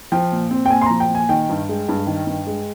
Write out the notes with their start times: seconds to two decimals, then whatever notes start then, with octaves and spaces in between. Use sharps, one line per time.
0.12 F3 G5
0.32 A#2
0.51 C4
0.66 G5
0.70 A#2 G#5
0.81 C6
0.86 F3 A#5
1.00 G5
1.10 A#2
1.15 G#5
1.29 D#3 G5
1.49 G2
1.69 G#3
1.89 G2
2.07 D#3
2.27 G2
2.47 G#3